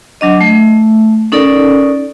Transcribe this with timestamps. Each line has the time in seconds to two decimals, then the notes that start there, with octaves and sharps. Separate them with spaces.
0.21 F#3 D4 D#5
0.41 A3
1.32 C#4 D#4 A4 A#4 D5